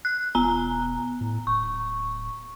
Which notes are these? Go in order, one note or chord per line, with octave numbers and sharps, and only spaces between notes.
F#6
E1 B3 A#5
A2
D1 C#6